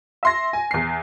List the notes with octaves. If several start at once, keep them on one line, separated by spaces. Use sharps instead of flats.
E5 C6 A#6
G#5
E2 C7